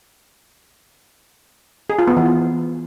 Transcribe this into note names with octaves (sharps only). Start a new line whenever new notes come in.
G#4
F4
B3
E3
F4